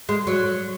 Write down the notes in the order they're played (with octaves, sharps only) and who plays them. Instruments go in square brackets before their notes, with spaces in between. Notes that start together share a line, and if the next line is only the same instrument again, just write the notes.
[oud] G#3
F#3